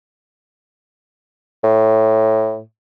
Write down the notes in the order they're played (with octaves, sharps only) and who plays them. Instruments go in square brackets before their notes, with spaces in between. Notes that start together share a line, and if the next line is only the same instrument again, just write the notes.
[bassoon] A2